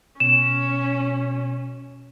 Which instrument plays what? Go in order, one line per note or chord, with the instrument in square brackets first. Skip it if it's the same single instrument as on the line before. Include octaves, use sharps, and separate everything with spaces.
[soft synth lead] B2 [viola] C#4 [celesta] E7